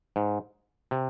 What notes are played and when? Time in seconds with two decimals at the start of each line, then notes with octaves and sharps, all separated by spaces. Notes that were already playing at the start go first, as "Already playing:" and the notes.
0.16 G#2
0.91 C3